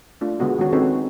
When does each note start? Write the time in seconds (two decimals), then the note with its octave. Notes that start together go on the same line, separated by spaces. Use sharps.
0.21 A3 D4 F4
0.39 D3 G#3 B3 F#4 G#4
0.58 D#3 G#3 C#4 F#4 C#5
0.73 C4 C#4 D#4 A4 B4 C#5